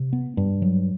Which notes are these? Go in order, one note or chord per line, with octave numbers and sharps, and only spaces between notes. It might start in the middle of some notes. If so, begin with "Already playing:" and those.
Already playing: C3
B3
G2
F#3